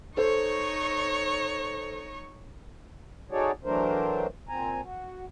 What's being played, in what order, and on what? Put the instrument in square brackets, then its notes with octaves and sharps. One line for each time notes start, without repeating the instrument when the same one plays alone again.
[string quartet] D#4 C#5 C#6 [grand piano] A4 C5
[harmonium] D#4 F#4 G#4 A4 C#5 D5
E3 F#3 A3 D4 A#4 C5
A#2 C4 G#5 A#5
F#4